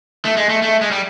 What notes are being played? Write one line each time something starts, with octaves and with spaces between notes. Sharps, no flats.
A3
G#3
A3
A3
G#3
G3